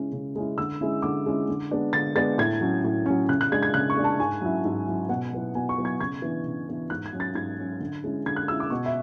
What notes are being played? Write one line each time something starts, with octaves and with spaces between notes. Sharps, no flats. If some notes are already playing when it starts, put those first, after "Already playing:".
Already playing: C#3 G#3 C#4 E4
C#3
G#3 C#4 E4
D3 E6
G#3 C#4 E4
D3 D6
G#3 C#4 E4
D3
G#3 B3 D4
D3 A6
G#3 B3 D4 A6
A2 G#6
F#3 C#4
A2
F#3 C#4
C#3 F#6
F#6
G#3 D4 G#6
G#6
C#3 F#6
C#6
G#3 D4
A5
G#2 G#5
F#3 C#4 E4
G#2
F#3 C#4 E4
B2 F#5
F#3 B3 E4
B2 G#5
C#6
F#3 B3 E4
G#6
C#3 G#6
E3 B3 D4
C#3
E3 B3 D4
G#2 F#6
G#6
F#3 C#4
A6
G#2 G#6
F#3 C#4
D3
G#3 C#4 E4
D3 G#6
F#6
G#3 C#4 E4 E6
D6
B2 C#6
E5